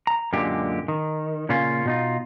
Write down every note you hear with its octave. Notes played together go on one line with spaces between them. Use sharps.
A#5
F#2 A#2 D3 G#3 G4
D#3
A#2 C#3 A#3 C#4 F4
B2 D#4 F4